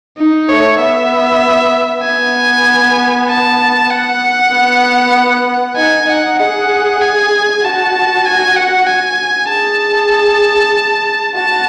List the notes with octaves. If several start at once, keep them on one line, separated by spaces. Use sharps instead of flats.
D#4
A3 C#5
B3 E5
B3 G#5
A5
F#5
B3
D#4 G#5
D#4 F#5
G#4 F#5
G#5
F#4 A5
G#5
F#5
G#5
G#4 A5
F#4 A5